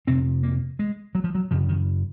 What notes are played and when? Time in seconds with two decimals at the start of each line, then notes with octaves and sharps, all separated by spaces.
0.07 F2 C3 C4
0.43 A#3
0.79 G#3
1.15 F#3
1.24 F3
1.35 F#3
1.51 F#2 C#3 F3
1.69 D#3